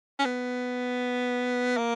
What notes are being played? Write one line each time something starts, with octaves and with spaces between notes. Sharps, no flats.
C#4
B3
A#3